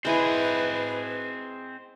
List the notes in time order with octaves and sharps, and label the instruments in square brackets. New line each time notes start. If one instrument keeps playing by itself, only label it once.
[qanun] G#3 E4 [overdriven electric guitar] C4 G#4 [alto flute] B4